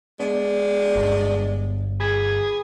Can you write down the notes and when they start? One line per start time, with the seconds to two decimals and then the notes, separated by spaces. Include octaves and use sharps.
0.20 G#3 B3 D4
0.96 G1
2.00 G#4 B5 G#6 B6